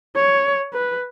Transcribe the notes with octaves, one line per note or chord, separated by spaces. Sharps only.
C#5
B4